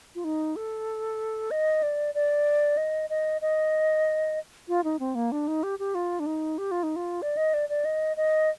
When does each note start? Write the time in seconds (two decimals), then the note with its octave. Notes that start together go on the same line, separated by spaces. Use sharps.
0.15 F4
0.24 D#4
0.56 A4
1.51 D#5
1.83 D5
2.15 D5
2.77 D#5
3.10 D#5
3.41 D#5
4.68 F4
4.84 D#4
4.99 C4
5.15 A#3
5.32 D4
5.48 D#4
5.63 G4
5.79 G4
5.95 F4
6.20 D4
6.26 D#4
6.58 G4
6.71 F4
6.83 D#4
6.96 F4
7.22 D5
7.37 D#5
7.54 D5
7.69 D5
7.85 D#5
8.17 D#5